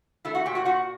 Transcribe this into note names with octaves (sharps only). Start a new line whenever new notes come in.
A3 E4 E5
F#4 F#5
A#2 G4 G5
F#4 F#5
A#2 F#4 F#5